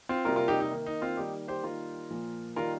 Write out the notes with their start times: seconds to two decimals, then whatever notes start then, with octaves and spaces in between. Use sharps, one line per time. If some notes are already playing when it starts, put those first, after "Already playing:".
0.09 C4 F4
0.25 C3 G3 A#3 F4 A#4
0.36 F4 A#4
0.48 D#4 G4
0.60 D#4
0.71 D#3 A#3
0.86 D#4
1.02 C4 F4
1.17 D#3 G3 A#3 D#4 G4
1.48 G4 C5
1.63 D#3 G3 A#3 F4 A#4
2.10 A#2 F3 A#3
2.56 D#3 G3 A#3 F4 A#4